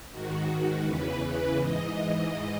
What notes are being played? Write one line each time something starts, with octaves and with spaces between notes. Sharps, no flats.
G#2 D#3 F#4
E2 C#3 E3 B4
G#2 E3 D#5